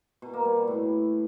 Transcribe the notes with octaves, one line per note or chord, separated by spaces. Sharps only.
B2
A#3
G3
B2
A2